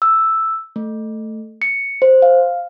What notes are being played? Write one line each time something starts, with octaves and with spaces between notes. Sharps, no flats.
E6
A3
C#7
C5
F5